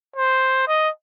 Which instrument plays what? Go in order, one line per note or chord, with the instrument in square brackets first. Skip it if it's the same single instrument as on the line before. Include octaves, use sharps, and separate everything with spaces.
[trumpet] C5
D#5